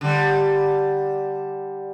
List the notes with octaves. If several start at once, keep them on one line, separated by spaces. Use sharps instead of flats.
D3 G3